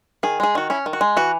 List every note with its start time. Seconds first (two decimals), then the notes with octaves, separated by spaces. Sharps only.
0.23 D#3 G#4
0.40 G#3 G#4
0.55 D#3 F#4
0.70 C#4 E4
0.86 D#3
0.93 F#4
1.01 G#3
1.17 E3 F#4